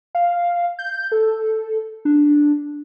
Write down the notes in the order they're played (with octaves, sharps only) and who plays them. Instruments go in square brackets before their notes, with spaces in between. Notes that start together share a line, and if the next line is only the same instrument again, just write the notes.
[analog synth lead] F5
G6
A4
D4